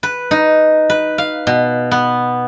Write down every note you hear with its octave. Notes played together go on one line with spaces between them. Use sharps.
B4
D#4
B4
F5
B2
B3